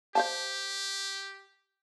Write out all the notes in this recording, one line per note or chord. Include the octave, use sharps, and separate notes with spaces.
G4 C5 F5 A5